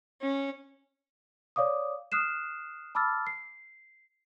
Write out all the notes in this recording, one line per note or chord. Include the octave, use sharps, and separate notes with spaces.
C#4
C#5 D5 F5 D6 D#6
D#6 F6 F#6 C7 E7
A5 B5 D6 E6 F6 A6
C7